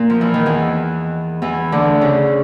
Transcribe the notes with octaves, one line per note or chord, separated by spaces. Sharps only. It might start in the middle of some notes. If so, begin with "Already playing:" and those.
Already playing: A#2
F3
E3
D#3
E2 E3
E2 E3
D2 D3
C#3